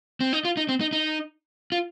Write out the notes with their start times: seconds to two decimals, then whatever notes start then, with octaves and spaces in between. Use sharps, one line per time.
0.21 C4
0.33 D#4
0.45 F4
0.57 D#4
0.69 C4
0.81 D#4
0.93 D#4
1.72 F4